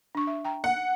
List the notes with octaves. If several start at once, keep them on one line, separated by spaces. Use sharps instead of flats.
D4 C#6
E5
G5 A#5
F#5